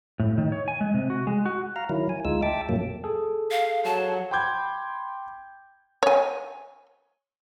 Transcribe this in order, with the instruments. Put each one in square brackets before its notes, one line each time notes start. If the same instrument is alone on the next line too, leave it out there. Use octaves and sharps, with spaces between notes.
[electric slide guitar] A2
D#3
C#5
G#5
G#3
C3
F#4
G#3
F#4
[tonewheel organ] F5 A#5
D#3 F#3 E4
G#5
D2 G#3 D#4 F4 E6
E5 G5 A5 D6
F#2 A#2 F#3 A#3
[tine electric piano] G#4 A4
[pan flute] F5
[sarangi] F#3 [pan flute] A5
[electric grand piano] G5 B5 C6 D6 G6 G#6
[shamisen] C#5 G#5